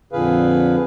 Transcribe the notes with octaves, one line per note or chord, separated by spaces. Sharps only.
F2 A#2 D3 G#4 B4 F5